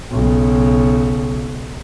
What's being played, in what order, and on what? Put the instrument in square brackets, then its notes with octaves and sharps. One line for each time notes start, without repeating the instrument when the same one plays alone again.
[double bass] B1 C#3